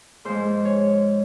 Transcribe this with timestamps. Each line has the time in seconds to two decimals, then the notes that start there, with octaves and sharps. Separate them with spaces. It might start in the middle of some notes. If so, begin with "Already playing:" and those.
0.25 G#2 F3 G#3 C5
0.65 C#5